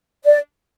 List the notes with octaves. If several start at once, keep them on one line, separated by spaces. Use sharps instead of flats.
D5